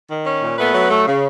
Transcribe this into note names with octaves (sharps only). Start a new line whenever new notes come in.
D#3
C#4
A#2
A3 B3 B4
F#3
A3
C#3